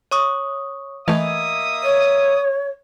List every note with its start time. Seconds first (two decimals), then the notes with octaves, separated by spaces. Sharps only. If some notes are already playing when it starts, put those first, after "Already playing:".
0.11 C#5 C#6 D#6
1.08 E3 A3 A#3 D#5 E5 D#6
1.82 C#5